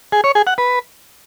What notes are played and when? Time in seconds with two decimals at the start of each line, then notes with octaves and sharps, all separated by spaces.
0.12 G#4
0.24 C#5
0.35 G#4
0.47 F#5
0.58 B4